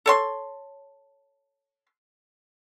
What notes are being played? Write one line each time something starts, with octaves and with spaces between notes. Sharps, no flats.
A4 C#5 C6